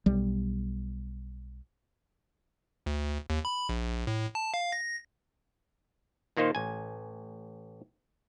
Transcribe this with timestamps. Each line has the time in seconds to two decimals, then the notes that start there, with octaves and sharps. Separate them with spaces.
0.06 B1 G3
2.86 D2
3.30 D#2
3.45 B5
3.69 A#1
4.07 A2
4.35 A5
4.54 F5
4.72 A#6
6.37 A#2 D#3 A#3 D#4 C5
6.55 A1 G#5